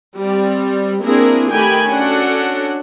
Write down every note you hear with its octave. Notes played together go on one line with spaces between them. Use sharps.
G3 C4
A#3 C4 D4 E4 G#4 A#4
D#3 A3 G4 G5 G#5 B5
C#4 D4 F#4 A4 F#5